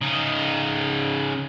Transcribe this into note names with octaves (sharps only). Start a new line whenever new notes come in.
C#3 D#4